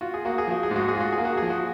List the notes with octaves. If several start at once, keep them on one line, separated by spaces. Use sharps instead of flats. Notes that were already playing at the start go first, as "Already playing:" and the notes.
F4 F#4
G#4
A#3 F#4
G#4
F3 F#4
G#4
G#2 F#4
G#4
F4 F#4
G#4
A#3
F#4
F3 G#4
F#4